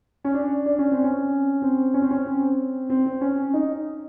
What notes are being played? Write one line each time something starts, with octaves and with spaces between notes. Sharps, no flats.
C#4
D4
D4
C#4
C4
C#4
C4
C#4
C4
C#4
C4
C4
C4
C#4
D#4